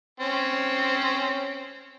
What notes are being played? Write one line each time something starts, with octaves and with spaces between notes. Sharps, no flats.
C4 C#4